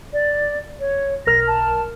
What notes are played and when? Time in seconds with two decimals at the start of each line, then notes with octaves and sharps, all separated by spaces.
0.13 D5
0.80 C#5
1.27 B1 A#4 F6 A#6
1.47 A5